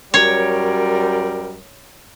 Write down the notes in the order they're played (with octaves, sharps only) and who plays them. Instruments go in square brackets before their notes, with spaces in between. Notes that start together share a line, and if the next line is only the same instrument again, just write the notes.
[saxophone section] F#2 G3 A#4 [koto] C#5